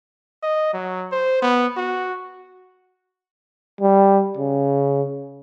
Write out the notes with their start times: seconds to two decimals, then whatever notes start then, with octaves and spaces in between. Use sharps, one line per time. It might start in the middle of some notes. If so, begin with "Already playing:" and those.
0.43 D#5
0.73 F#3
1.12 C5
1.42 B3
1.77 F#4
3.81 G3
4.37 C#3